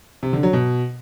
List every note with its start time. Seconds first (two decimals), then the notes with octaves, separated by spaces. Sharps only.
0.23 C3
0.33 D3
0.43 F#3
0.53 B2